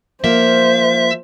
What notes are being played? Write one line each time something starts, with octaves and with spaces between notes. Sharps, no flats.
F3 A#3 C5 E5